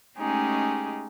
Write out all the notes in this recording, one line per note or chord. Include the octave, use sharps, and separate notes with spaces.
G#3 A3 C#4 D#4 G4 G#4